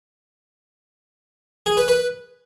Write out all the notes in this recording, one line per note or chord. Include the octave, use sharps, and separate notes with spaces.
G#4
B4
B4